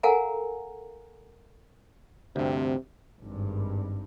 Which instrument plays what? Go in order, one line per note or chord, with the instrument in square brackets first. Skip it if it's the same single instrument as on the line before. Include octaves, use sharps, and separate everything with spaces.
[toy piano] A4 A#4 F5 F#5 G#5 A#5
[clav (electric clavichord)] D2 G2 [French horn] C3 [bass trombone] C4
[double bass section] G#1 G2